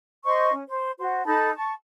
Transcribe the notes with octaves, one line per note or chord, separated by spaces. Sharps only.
C5 D#5 C6 C#6
C#4
C5
F#4 C5
D#4 A4 A5 B5
A5 C#6